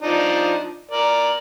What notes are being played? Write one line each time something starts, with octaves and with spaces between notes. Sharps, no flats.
F3 D4 D#4
A#4 D5